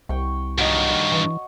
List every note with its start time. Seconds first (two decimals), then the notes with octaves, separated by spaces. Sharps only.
0.09 C2 G5 C#6
0.58 G2 D#3 F#4 C#5 D#5
1.12 E3